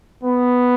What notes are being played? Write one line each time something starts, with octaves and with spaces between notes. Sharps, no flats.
B3